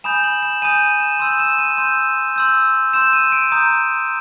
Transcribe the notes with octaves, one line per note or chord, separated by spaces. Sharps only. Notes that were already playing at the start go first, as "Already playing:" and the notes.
G#5 B5 D#6 G6 E7
F#7
E7
G#5 B5 D#6 G6 D#7
E7
C6 E6 G6 D#7
E7
D#7
C6 E6 G6
C6 E6 G6
C6 E6 G6 E7
D#7
D7
A#5 D#6 G6